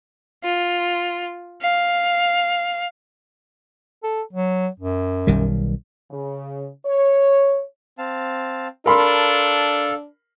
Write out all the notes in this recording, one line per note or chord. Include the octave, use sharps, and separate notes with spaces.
F4
F5
A4
F#3
F#2
B1 D#3 G3
C#3
C#5
C4 F5 A5
D4 A4 A#4 F5 B5 C6